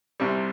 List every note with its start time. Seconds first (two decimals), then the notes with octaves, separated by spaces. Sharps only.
0.20 C2 C3 G3